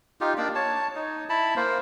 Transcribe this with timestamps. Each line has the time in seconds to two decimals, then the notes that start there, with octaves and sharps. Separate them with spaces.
0.21 D#4 F4 G4
0.38 A#3 D4 D5
0.55 C#5 A5
0.95 D#4
1.29 E4 A5 B5
1.56 A#3 C5